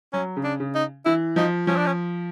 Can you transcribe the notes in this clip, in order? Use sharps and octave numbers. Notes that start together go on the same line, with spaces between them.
F#3 C#4
C#3
D4
C#3
D#4
E3 E4
F3 D#4
F3 C#4
D4
C#4